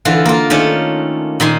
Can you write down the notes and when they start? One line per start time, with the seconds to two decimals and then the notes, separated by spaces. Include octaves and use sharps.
0.05 D3 E3 F4
0.26 A#3 F4
0.50 D#3 A3 C#4 D4
1.40 A#2 D#3 G#5 C6